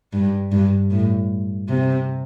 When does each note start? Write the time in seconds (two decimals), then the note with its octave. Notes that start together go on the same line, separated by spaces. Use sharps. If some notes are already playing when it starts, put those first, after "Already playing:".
0.13 G2
0.52 G2
0.91 A2
1.69 C3